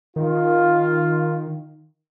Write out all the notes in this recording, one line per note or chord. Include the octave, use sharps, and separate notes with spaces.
D#3 F4